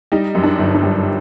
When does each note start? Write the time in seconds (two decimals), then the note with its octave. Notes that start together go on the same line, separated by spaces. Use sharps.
0.12 G3 D#4
0.35 F#2
0.44 D4
0.59 G1
0.74 D4
0.83 G3